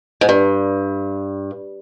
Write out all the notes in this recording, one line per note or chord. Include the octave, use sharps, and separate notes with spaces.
G#2
G2